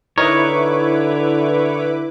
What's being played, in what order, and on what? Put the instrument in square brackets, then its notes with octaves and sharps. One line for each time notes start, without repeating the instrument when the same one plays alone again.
[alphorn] D3 [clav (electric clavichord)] D#4 A#4 [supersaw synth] E4 B4 D6 [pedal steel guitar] C#5